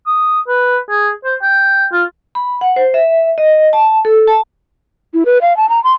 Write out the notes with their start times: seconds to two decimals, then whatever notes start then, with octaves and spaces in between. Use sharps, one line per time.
0.06 D#6
0.48 B4
0.89 G#4
1.24 C5
1.42 G5
1.92 F4
2.35 B5
2.61 F#5
2.76 C5
2.94 E5
3.38 D#5
3.73 A5
4.05 A4
4.27 A5
5.13 E4
5.26 B4
5.42 F5
5.57 A5
5.69 A#5
5.84 C6